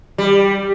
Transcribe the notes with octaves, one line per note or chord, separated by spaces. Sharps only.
G3